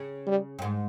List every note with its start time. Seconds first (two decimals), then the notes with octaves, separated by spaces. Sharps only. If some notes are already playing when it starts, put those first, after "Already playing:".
Already playing: C#3
0.27 G3
0.59 G2
0.62 G#2